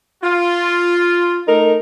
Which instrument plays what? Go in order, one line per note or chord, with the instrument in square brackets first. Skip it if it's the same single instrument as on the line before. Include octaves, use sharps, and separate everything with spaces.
[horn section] F4
[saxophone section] A3 D#4 A#4